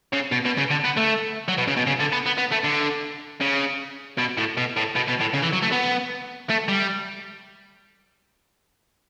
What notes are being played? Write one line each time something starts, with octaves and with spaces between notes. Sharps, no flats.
C#3
B2
B2
C#3
D3
B3
A3
F#3
B2
C#3
B2
C#3
D3
B3
B3
B3
A3
D3
C#3
B2
A2
B2
A2
B2
B2
A2
C#3
E3
F#3
A3
B3
A3
G3